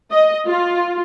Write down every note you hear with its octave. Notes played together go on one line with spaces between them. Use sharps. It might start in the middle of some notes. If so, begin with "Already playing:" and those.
D#5
F4